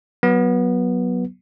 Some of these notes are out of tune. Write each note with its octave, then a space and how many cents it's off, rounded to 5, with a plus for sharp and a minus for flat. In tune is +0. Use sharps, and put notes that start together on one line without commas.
F#3 +0 B3 -15